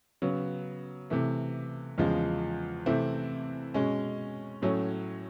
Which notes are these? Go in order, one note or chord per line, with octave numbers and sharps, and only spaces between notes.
C#3 F#3 B3
C3 E3 A3
E2 C#3 F3 G#3
C3 E3 A3 C4 E4
B2 G#3 C#4
A2 F#3 A3 C#4